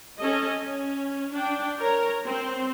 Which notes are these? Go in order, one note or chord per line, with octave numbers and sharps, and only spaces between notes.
C#4 A4 D#5
C#4
D4 G5
A#4 C#5 A#5
C4 C5